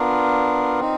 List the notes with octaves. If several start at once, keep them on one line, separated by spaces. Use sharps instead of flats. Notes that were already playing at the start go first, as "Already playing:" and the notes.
Already playing: B3 D4 F4 A#4
C4 D#4